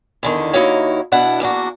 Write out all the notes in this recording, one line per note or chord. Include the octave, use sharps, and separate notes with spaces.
E2 D3 D#3
D#2 D#4 E4 F#4 C#5 F5
B2 D4 E4 F#5
E2 A#3 D4 F#4